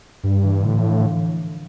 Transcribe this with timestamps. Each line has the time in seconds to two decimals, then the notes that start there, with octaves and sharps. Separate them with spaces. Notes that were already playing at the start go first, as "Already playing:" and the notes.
0.23 G2 G3
0.44 E3
0.63 A2 D3
0.76 F3
0.84 E3